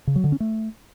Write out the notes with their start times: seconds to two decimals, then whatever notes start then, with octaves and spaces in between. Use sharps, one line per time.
0.07 C#3
0.16 F#3
0.24 D3
0.32 C#4
0.40 A3